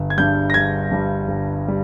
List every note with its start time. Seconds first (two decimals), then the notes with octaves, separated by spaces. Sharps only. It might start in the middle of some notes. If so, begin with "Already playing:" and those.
Already playing: G1
0.10 G#6
0.18 G2 G3 G6
0.50 A#6
0.54 G1 G#6
0.91 G2 G3
1.28 G1
1.68 G3